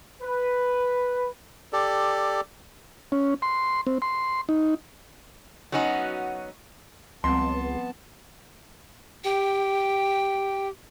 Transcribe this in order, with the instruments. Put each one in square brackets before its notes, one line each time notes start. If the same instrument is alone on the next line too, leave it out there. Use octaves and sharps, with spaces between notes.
[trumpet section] B4
[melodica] G4 A4 D5
[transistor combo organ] C#4
C6
C4
C6
D#4
[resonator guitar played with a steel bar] F#3 B3 C#4 D#4 F#4
[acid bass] C#2 [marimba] F3 G3 C4 [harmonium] B3 A5 [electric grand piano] C6
[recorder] G4 [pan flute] G5